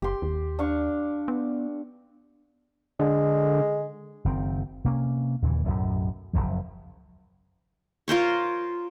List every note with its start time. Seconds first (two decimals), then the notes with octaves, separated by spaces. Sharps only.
0.02 F#1 G4 C6
0.22 D#2
0.59 D4 F5 C#6
1.28 B3
3.00 D3 G#3
4.25 F#1 D#3 C4
4.84 C3 A#3 C#4
5.42 D#2 A#2 C#3 E3
5.64 B1 F#2 A2
6.33 F#1 B1 F#2 F3
8.08 F4 A#4 C5 C#5